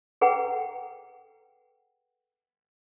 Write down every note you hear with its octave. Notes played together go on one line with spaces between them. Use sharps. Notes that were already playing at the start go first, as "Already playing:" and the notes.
G#4 A4 B4 F#5 G5 A#5